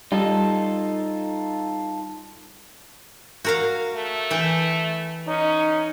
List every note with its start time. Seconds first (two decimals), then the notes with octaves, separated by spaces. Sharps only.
0.12 G3 D#4 F4 A4
3.45 F#4 A#4 F5
3.95 A3
4.31 E3 G5
5.27 C#4 D#4